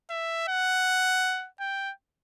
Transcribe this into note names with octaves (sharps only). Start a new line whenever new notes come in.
E5
F#5
G5